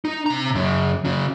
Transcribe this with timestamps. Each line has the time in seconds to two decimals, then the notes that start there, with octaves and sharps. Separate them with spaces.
0.05 D#4
0.26 C3 A#5
0.55 F#2 C#3
1.05 C#3 F#3